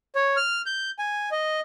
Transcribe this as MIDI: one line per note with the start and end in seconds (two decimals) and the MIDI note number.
0.15 0.36 73
0.37 0.62 89
0.66 0.90 91
0.99 1.29 80
1.32 1.60 75